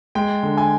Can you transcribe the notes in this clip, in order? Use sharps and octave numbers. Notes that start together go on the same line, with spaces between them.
G#3 G5
D3
G#5